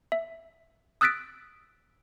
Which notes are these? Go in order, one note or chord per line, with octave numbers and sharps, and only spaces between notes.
E5
D#6 E6 F#6 A6 B6 D7